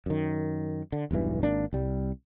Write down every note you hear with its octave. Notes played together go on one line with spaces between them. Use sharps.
F#2 D#3
D3
E1 B1 G2 E3
G#1 A#3 D4
C2 G3